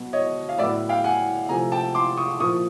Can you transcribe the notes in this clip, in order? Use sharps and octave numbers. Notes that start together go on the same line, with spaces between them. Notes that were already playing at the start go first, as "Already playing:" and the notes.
Already playing: B2 F#3 B3
C#5 D#5
F5
A2 F#3 B3 D5 E5
F5 G5
F#5 G#5
C3 F3 A3 G#5 A#5
G5 A5
C6 D6
C#6 D#6
A#2 F3 A#3 C#6 D#6